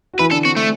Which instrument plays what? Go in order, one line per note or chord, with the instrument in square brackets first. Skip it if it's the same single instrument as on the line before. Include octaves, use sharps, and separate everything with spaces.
[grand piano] F#4
[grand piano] E3 E4 [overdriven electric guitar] B4
[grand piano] D3 D4 [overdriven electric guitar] A4
[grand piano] C4 [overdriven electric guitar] F#4
[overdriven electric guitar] A3